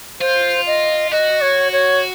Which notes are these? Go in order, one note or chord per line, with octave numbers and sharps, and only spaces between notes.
F4 C5
D#5
F#4 D#5
C#5
C#5